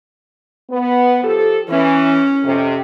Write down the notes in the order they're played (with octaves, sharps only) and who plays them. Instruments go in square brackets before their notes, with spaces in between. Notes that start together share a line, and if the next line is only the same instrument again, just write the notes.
[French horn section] B3
F3 G4 A4
[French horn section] E3 [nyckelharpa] C#4
[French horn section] F2 C3